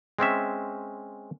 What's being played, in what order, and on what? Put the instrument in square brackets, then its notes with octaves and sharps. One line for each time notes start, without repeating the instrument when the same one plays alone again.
[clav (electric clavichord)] G#3 C4 C#4 E5